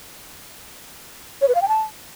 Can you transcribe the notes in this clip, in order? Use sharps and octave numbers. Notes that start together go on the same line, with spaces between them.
C#5
B4
F5
G5
A5